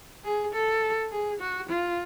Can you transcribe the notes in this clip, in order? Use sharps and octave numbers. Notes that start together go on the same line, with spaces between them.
G#4
A4
G#4
F#4
F4